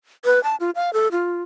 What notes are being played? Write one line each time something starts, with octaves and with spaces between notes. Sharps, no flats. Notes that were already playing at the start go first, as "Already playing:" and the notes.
B4
A5
F4
F5
A4
F4